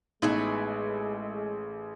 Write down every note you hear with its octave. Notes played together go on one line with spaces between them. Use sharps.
A1 G#3 A3 B3 D#4 G#4 B4